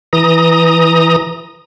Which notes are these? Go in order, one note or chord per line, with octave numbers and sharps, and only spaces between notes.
E3 A#5 D#6